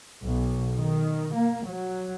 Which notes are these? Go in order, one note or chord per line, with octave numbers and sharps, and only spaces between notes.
B1
D#3
A#3
F#3